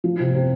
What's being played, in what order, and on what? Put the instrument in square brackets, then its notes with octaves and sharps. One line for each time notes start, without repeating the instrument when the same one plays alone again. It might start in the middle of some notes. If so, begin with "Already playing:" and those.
[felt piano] F3
C3
C3